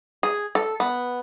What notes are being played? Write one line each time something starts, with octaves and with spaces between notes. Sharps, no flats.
G#4
A4
B3